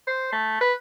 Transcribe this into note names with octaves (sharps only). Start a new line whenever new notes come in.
C5
A3
B4